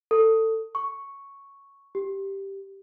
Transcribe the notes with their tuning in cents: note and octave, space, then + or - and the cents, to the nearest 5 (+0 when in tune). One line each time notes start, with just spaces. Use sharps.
A4 +20
C#6 +0
G4 -5